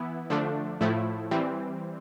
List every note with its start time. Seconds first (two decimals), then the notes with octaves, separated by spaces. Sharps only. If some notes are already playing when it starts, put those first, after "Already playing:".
Already playing: E3 B3 E4
0.30 D3 F3 A3 D4
0.81 A2 F3 A3 E4
1.31 E3 G3 C4